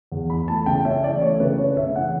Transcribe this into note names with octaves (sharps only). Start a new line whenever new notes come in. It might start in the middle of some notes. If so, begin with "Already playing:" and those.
E2
E3 B5
A3 A5
C#3 G5
C#4 E5
E3 D5
A3 C#5
C#3 B4
C#4 C#5
C#3 E5
E3 F#5